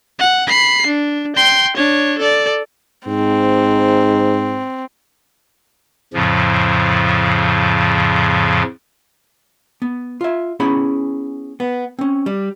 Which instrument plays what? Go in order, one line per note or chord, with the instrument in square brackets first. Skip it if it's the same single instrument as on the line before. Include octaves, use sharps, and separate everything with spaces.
[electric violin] F#5
B5 C7
D4
G5 C6
D4 C#5
A4 D5
[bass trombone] G#2 [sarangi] C4
[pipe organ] F2 A2 C#3 F3
[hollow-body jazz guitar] B3
F4 E5
B3 C#4 E4 G#4 B5
B3
C4 C#4
G3